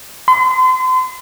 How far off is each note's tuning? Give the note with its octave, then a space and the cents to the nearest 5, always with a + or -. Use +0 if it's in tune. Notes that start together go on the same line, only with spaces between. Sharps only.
C6 -40